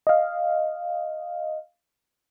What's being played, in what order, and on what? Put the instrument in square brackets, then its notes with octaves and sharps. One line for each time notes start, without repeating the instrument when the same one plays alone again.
[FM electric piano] D#5 F5